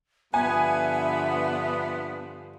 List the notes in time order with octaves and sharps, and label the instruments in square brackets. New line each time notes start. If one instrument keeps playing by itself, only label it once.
[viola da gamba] G2 D3 F3 [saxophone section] B3 [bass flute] E5 [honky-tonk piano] G#5